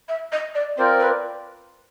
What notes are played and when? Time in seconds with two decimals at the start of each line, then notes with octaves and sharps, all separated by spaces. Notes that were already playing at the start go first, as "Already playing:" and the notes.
0.09 E5
0.32 D#5
0.55 D5
0.78 C4 F4 A#4 C5 D5
1.00 B4